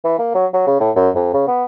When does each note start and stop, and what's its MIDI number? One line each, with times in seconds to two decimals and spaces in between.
0.04 0.16 52
0.19 0.34 58
0.35 0.46 54
0.53 0.62 54
0.67 0.79 49
0.80 0.91 45
0.96 1.10 42
1.15 1.32 41
1.33 1.45 49
1.48 1.65 59